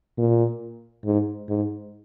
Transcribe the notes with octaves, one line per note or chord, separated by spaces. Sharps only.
A#2
G#2
G#2